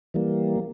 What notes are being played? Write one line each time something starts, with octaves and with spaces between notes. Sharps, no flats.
E3 G3 A#3